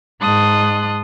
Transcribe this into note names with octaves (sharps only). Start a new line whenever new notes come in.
G#2 G#3 A5 C6 D#6 F#6